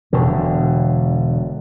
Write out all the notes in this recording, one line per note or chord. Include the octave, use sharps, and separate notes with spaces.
E1 B2 D3